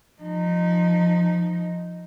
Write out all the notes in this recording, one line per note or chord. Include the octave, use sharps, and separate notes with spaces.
F3 D#4